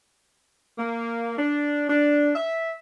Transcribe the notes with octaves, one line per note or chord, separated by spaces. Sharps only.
A#3
D4
D4
E5